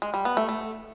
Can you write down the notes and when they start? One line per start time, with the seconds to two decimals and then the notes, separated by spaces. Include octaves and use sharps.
0.02 G#3
0.14 G3
0.25 B3
0.37 A3
0.49 A3